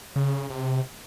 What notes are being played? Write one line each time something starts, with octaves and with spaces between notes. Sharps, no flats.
C#3
C3